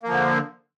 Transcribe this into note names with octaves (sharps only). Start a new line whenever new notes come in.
D3 F3 A#3